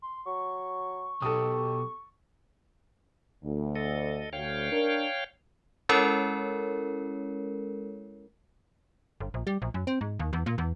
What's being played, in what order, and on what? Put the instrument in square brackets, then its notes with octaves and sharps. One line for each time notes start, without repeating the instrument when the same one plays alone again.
[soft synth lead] C6
[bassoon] F#3 [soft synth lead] C#6
[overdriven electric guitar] B1 [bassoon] G4 [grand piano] A4 D#6
[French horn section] D2
[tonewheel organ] A4 D#5
[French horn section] D2 [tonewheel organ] C#5 F5 G5
[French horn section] D4 A#4
[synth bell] G#3 C#4 E4 A4 A#4 C#5
[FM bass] G1
A#1
G3
A#1
F#2
C4
G#2
D#2
E2
A#2
E2